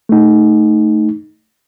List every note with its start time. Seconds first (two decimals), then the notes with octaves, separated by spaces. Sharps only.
0.09 A3 D#4